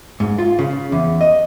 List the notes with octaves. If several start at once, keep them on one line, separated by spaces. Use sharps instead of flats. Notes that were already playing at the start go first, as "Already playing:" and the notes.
G#2
F4
C#3
E2
D#5